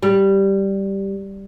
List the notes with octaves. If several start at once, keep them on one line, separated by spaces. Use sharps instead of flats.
G3